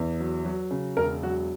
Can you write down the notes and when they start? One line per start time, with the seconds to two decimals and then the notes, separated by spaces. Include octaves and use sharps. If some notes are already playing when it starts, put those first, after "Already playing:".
Already playing: E2
0.20 F#3
0.45 F#3
0.71 C#3
0.97 E1 A#4
1.23 F#3 F#4